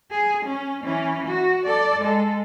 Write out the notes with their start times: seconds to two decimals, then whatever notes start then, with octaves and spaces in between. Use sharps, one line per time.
0.11 G#4
0.46 C#4
0.84 E3 C#4
1.27 F#4
1.66 A4 D5
2.01 G#3 A4